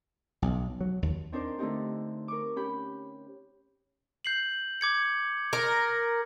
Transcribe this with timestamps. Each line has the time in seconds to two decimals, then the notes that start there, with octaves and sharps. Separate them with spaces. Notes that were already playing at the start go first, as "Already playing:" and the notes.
0.42 B1
0.81 F#3
1.02 D#2
1.32 C4 D4 D#4 A#4 C5 D5
1.59 D3 A3 C4 D#4 G4
2.28 A#4 C#6 D6
2.56 C#4 G4 B5 G6
4.25 G6 C7 F#7
4.81 D6 G#6 C#7
5.53 A#4